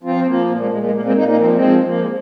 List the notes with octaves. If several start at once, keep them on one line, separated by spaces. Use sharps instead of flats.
F3 C4 F4
C4
F3 A#3
A#2 A#3
G#3
A#2 G#3
G#3
A#2 A#3
G#3 C4
A#2 A#3 D#4
A#3 D#4
F3 C4
A#3
G#3 C4
F3
F3 A#3
G#3